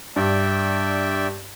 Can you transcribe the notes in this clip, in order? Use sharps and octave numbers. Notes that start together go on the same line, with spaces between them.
G2 D5 E5 G5